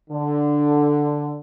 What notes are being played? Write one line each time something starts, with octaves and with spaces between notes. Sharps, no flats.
D3